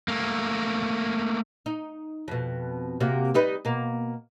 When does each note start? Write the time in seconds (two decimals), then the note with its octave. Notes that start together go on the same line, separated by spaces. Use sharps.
0.08 A3 A#3
1.66 D#4
2.28 F2 B2
3.00 C3 A#3 F#4
3.34 G3 D#4 B4
3.65 B2 A#3